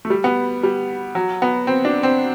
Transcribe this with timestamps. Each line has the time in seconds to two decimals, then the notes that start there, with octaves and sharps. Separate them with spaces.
0.05 A3
0.10 G3
0.24 B3
0.63 G3
1.15 F#3
1.42 B3
1.67 C4
1.85 D4
2.03 C4